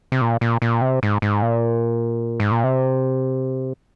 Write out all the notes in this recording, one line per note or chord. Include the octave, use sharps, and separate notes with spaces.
C3
A#2
A#2
A#2
C3
G#2
G#2
A#2
G#2
A#2
C3